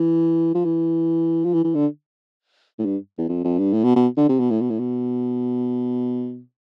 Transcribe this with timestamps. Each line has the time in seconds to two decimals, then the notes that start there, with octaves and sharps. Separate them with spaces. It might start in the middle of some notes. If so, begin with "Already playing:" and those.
Already playing: E3
0.55 F3
0.65 E3
1.44 F3
1.54 E3
1.64 E3
1.75 D3
2.79 A2
2.85 G2
3.18 E2
3.29 F2
3.44 F2
3.59 G2
3.73 A2
3.84 B2
3.96 B2
4.17 D3
4.29 C3
4.40 B2
4.51 A2
4.61 B2
4.70 A2
4.79 B2